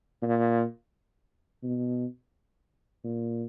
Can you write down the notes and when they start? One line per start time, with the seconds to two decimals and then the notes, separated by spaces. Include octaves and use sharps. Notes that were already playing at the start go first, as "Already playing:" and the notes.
0.22 A#2
1.63 B2
3.04 A#2